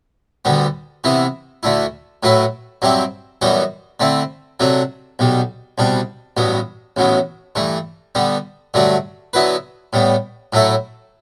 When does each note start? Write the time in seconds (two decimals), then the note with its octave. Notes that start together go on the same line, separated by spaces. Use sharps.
0.45 D2 D3 G3 B3
1.04 C3 E3 B3 E4
1.63 D2 D3 A3 E4
2.23 A2 F#3 A3 E4 B4
2.82 G2 F#3 C4 E4 G4
3.42 F#2 E3 G3 B3 F#4
4.00 D3 A3 C4 E4
4.60 C3 F#3 A3 D4
5.19 B1 B2 G3
5.78 C2 B2 G3 D4
6.37 A1 G2 F#3 B3
6.96 A1 A2 F#3 B3
7.55 G2 E3 A3
8.15 D3 G3 B3
8.74 G2 D3 F#3 A3 D4
9.33 D3 F#3 B3 E4 B4
9.93 A2 G3 B3
10.53 A2 F#3 A3 E4 A4